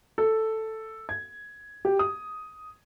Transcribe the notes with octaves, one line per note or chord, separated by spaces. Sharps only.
A4
G#6
G4
D#6